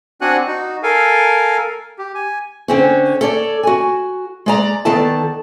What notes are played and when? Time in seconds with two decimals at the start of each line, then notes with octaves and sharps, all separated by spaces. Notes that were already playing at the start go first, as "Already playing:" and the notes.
0.21 C4 D4 F#4 F#5 G#5 F#6
0.47 D#4 F#4
0.83 A4 A#4 F5 G#5
1.99 G4
2.15 G#5
2.68 D3 C4 C#4
3.21 A4 C#5 D5
3.63 F#4 G#5
4.46 G#3 D5 A#5
4.85 D#3 B3 D#4 A4 D5 A5